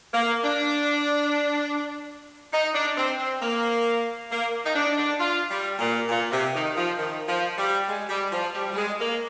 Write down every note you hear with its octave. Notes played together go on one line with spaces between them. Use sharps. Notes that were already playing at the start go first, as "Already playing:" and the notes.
A#3
D4
D#4
D4
C4
C4
A#3
A#3
D#4
D4
D4
F4
G3
A#2
A#2
C3
D#3
F3
D#3
F3
G3
G#3
G3
F3
G3
G3
G#3
A#3